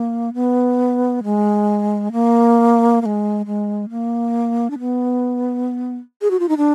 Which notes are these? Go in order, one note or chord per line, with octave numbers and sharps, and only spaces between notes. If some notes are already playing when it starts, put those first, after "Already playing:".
Already playing: A#3
B3
G#3
A#3
A#3
G#3
G#3
A#3
D4
B3
G#4
F#4
F4
D#4
D4